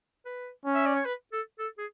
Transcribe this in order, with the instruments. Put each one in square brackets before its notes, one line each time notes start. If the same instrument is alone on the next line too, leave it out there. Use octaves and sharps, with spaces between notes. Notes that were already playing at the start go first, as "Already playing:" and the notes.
[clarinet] B4
[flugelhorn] C#4
[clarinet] E5
D5
C#5
B4
A4
A4
G#4